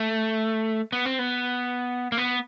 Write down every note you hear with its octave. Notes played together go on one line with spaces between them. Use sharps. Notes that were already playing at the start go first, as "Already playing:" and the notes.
Already playing: A3
B3
C4
B3
A#3
B3